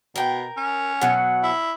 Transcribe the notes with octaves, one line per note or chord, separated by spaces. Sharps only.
B2 A#4 G5
C#4
B2 F#3 F#5
E4